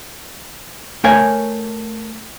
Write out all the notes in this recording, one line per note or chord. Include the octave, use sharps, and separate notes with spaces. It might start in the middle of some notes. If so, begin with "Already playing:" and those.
A3 A#4 C#5 F5 G#5